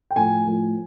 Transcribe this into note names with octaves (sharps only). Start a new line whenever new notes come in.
G5
A2 F3 G#5
A2 F3